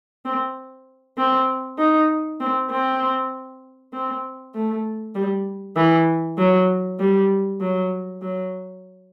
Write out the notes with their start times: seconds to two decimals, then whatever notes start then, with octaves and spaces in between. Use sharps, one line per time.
0.25 C4
1.18 C4
1.79 D#4
2.40 C4
2.71 C4
3.93 C4
4.54 A3
5.15 G3
5.77 E3
6.38 F#3
7.00 G3
7.60 F#3
8.22 F#3